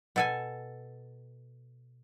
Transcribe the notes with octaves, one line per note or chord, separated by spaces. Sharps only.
B2 A4 G#5